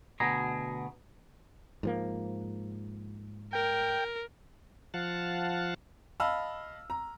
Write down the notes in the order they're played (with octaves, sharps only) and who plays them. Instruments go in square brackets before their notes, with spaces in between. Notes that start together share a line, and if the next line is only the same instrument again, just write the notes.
[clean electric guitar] D2 B2 G#4 A#5
[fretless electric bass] G#2 F3 A#3
[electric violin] A#4 [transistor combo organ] G5
[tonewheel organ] F3 F5 F#5 A5
[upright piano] D#5 F5 A5 B5 E6 F6
A#5